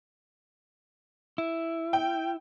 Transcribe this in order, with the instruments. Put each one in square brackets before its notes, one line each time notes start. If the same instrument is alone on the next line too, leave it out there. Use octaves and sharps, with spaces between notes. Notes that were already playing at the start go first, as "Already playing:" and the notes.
[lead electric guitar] E4
[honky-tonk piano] G5